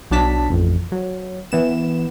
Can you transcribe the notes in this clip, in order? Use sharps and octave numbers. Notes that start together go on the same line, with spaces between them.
B1 F#3 D4 A5 B6
A1 F2
F#3
E3 B3 E7